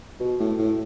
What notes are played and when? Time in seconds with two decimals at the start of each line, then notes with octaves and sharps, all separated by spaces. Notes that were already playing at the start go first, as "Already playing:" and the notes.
0.20 B2
0.40 A2
0.58 A2